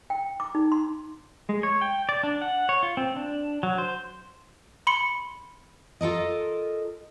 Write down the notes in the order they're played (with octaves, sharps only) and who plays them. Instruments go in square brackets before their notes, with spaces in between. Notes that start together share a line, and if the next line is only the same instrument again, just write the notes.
[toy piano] G5
D6
D#4
C6
[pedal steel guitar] G#3
C#5
G5
D5
D4
F#5
C#5
F4
C4
D4
F#3
C5
[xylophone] B5 C6 C#7
[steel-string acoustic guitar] F4 A4 A#4 D#5